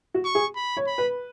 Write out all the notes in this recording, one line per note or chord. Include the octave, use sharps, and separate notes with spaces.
F#4
C#6
G#4
B5
C#5
B5
B4